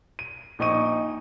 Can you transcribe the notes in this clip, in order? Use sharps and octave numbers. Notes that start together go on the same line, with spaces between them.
D#7
A#1 D#4 D#5 C#6 D#7